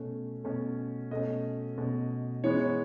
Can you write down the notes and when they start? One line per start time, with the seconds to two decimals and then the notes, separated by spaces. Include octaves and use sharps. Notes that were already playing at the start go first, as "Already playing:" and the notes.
Already playing: B2 A3 C#4
0.44 B2 A3 C#4
1.11 B2 A3 C#4 D#5
1.78 B2 A3 C#4
2.44 E3 G#3 B3 C#5
2.60 C#5